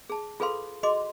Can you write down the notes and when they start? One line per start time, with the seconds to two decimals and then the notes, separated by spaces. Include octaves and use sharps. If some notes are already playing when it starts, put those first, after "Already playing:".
0.10 G#4 A5
0.40 F4 G#4 A4 B4 F5 C6
0.83 F#4 G#4 D#5 C6 D6